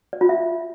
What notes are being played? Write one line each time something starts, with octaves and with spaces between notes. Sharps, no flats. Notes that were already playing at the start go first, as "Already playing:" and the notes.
D5
F4
E5